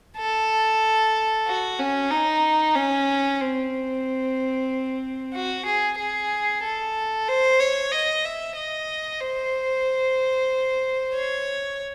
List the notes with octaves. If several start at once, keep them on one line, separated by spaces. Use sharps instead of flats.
A4
F#4
C#4
D#4
C#4
C4
F#4
G#4
G#4
A4
C5
C#5
D#5
E5
D#5
C5
C#5